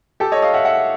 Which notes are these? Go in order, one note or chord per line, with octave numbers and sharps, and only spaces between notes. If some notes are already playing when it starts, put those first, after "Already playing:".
G4 A4
C#5 D#5
D#5 F5
E5 F#5
E5 F#5